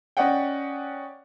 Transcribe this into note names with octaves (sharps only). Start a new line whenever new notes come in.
C#4 D5 D#5 F#5 G5